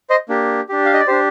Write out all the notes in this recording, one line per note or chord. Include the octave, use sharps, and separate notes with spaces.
C5 D#5
A#3 D4 G4
D4 G4
F5
D#5
D5
D4 G4 C5